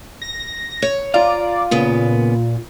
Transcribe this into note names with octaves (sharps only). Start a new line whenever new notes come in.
A#6
C#5
F4 D5 F5 A#5
A#2 C#3 B3